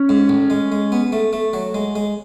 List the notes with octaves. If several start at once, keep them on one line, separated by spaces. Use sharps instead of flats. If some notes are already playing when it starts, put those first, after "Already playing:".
Already playing: C#4
G#2
A1
G#3
G#3
B3
A3
A3
F#3
G#3
G#3